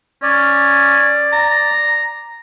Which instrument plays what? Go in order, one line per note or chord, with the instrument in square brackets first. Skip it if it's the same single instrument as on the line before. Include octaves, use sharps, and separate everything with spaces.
[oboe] C#4 [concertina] D5
[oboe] A#5